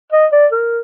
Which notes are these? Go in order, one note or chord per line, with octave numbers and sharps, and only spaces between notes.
D#5
D5
A#4